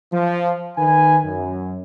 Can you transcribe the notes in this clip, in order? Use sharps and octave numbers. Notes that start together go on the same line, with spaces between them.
F3
D#3 B4 G#5
F#2